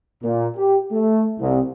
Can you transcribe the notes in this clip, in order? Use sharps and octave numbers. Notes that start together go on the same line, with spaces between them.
A#2
G4
A3
C2